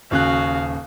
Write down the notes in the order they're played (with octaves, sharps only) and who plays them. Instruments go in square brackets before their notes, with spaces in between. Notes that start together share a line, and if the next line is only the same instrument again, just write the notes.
[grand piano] D#1 C#3 F#6 [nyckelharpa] F#4 F5